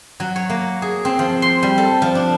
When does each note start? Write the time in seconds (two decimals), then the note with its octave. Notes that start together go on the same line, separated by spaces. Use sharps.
0.20 F#3
0.36 C#5
0.49 A#3
0.82 G#4
1.05 C4
1.19 F3
1.42 C6
1.63 G3
1.78 A4
2.02 F3
2.15 D4